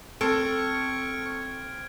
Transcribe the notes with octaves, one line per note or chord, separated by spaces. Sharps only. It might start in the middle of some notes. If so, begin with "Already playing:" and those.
C4 A4 C#6 F6 G#6 D7